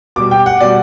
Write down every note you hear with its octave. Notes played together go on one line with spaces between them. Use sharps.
B2 G3 D6
G5
F#5
B2 G3 D5